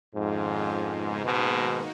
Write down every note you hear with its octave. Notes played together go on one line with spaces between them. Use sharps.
F2 G#2 D#3 G#3 C#4 F4
C#3 G#3 B3 D#4
G#2 B2 D#3 A#3 D#4 F#4